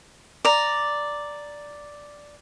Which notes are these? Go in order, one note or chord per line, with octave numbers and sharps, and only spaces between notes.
D5 A#5